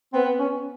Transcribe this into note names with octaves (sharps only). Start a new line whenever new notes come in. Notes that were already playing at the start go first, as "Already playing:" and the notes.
B3 C4
C#4